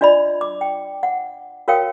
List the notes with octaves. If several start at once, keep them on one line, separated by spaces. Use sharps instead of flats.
D4 F4 D5 D#5 B5
D6
G5
F#5
F#4 A#4 C#5 F5 G5 D#6